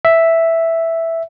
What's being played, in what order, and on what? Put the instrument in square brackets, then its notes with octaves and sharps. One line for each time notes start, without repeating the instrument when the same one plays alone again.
[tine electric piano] E5